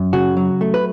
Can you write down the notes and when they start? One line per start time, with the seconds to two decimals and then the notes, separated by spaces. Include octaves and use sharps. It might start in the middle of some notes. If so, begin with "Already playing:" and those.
Already playing: F#2
0.13 C#3 F#4
0.37 F#3
0.61 A3
0.74 B4